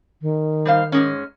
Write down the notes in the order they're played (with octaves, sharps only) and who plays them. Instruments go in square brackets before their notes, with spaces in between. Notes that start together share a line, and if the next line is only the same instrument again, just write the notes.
[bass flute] D#3
[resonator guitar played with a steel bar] G3 C5 F5
G#2 G#3 C#4